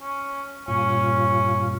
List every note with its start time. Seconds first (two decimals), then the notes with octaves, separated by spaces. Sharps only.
0.01 C#4
0.68 G2 A#2 C#4 F4